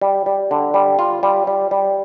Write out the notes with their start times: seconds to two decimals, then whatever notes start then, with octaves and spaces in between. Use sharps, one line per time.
0.02 G3
0.26 G3
0.51 D3
0.74 G3
0.99 F4
1.23 G3
1.47 G3
1.71 G3